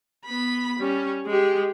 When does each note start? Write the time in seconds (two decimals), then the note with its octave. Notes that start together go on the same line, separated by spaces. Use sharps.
0.25 B3 B5
0.79 G3 C#4
1.26 G#3 G4